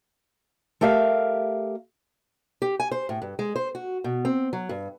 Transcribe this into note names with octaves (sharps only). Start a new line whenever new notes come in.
A3 G4 A#4 E5 F5
G4
G#5
C5
A2
G2
G#3
C5
F#4
B2
C4
F#3
G2